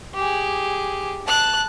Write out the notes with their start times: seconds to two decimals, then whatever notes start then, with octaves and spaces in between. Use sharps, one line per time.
0.14 G4 G#4
1.27 A5 F#6